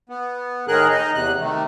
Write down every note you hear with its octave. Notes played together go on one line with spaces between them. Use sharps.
B3
A2 D#3 G#4 A#4 F#6
D#4 D#5
E2 C3 F#6
C3 D#3 A3